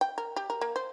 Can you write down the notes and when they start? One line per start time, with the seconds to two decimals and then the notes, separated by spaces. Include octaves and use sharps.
0.01 G5
0.18 A#4
0.36 G4
0.50 A#4
0.61 A#3
0.76 C5